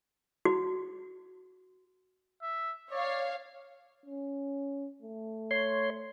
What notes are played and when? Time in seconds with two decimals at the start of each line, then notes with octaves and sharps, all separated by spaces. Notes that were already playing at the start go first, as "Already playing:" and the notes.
0.45 F#4
2.42 E5
2.91 C#5 D5 F5
4.06 C#4
5.02 A3
5.51 C#5 C6